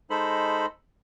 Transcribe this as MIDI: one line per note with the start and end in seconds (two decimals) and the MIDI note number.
0.10 0.66 56
0.10 0.66 63
0.10 0.66 69
0.10 0.66 72
0.10 0.66 83